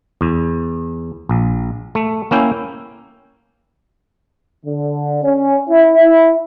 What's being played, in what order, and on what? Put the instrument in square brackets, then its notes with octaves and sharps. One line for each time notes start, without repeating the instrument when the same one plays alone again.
[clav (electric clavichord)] E2
A#1
A3
A#3 C#4 E4 G5
[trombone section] D3
C#4
E4